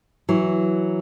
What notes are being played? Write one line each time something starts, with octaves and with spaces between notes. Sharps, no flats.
E3 F#3